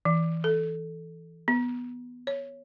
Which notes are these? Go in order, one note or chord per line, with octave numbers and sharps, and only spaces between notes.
E3
A4
B3
C#5